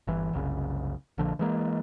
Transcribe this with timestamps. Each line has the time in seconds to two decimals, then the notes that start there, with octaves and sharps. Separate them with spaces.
0.07 G1 E3
0.33 F#1 C2 C#3
1.18 A#1 D3 F3
1.39 E3 G#3 A#3